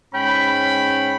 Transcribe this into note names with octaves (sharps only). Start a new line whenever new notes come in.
G#2 C#4 G5 B5